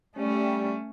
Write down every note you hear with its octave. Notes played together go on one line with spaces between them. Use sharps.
G3 A3 C#4